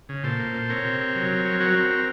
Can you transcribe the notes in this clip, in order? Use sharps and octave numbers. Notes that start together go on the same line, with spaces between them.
C#3
A#2 A4 C5
A#3
A#2
C4 A#4 C#5
C3
C4
F#3
C4
F#3
F#3 F#4 A#4
C4
C4